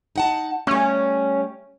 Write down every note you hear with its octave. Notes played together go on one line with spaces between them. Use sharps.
D#4 F#5 A5
G3 A3 C#4